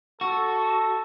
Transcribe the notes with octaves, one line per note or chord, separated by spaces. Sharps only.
F#4 A4